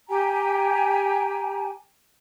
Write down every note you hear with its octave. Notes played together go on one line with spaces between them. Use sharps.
G4 G5 G#5 A#5